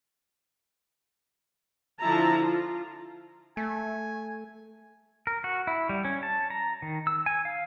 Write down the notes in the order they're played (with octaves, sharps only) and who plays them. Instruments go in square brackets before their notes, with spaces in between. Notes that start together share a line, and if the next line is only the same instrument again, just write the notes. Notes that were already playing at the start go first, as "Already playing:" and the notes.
[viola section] D3 F3 E4 A5 A#5
F4
[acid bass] A3 [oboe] G#5
[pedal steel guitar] A#4
F#4
E4
G3
C#4
A5
A#5
D#3
E6
G#5
F5